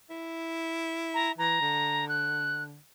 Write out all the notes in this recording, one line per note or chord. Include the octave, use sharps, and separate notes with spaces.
E4
A#5
E3 A#5
D3
F#6